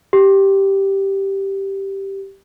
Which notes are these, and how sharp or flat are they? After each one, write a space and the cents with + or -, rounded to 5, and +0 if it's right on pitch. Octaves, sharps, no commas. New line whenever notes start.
G4 -5